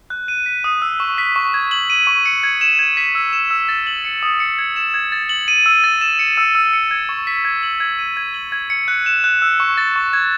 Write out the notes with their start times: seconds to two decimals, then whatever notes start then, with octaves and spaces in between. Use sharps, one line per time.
0.10 F#6
0.28 D#7
0.46 B6
0.64 D#6
0.82 E6
1.00 C#6
1.18 B6
1.36 C#6
1.54 G#6
1.71 F#7
1.90 D#7
2.07 C#6
2.26 C#7
2.43 G#6
2.61 E7
2.79 G#6
2.97 B6
3.15 E6
3.33 E7
3.51 E6
3.69 A6
3.87 F#7
4.05 C#7
4.23 D#6
4.40 C#7
4.58 G#6
4.76 E7
4.94 G#6
5.12 A6
5.29 F#7
5.48 D#7
5.66 E6
5.84 A6
6.01 E7
6.19 C#7
6.37 E6
6.55 E6
6.73 C#7
6.91 G#6
7.09 C#6
7.27 B6
7.45 G#6
7.63 F#7
7.80 G#6
7.99 D#7
8.17 G#6
8.34 F#7
8.52 G#6
8.70 C#7
8.88 F#6
9.06 E7
9.24 F#6
9.42 E6
9.60 C#6
9.78 A6
9.96 C#6
10.13 G#6